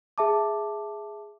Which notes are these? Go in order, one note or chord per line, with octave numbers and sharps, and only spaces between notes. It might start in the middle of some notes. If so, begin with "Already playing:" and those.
G#4 E5 A5 D6